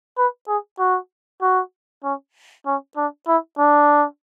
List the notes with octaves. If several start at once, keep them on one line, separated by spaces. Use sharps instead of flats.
B4
G#4
F#4
F#4
C#4
C#4
D4
E4
D4